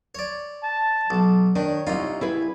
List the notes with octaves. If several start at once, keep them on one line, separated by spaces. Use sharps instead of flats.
C#5 D5
A5
B1
D#3 D4 C#5
C2 D#4 F4
E4 G#4 B4